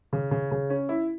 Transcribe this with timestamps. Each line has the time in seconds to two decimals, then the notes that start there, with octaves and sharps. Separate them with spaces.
0.13 C#3
0.31 C#3
0.51 C#3
0.70 C#4
0.89 E4